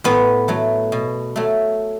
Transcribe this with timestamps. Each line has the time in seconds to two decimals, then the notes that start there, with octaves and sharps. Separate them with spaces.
0.04 A2 B3
0.48 F#3 A3
0.92 B2
1.36 F#3 A3